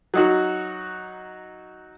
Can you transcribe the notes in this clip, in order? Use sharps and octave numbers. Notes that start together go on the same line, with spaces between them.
F#3 D#4 F#4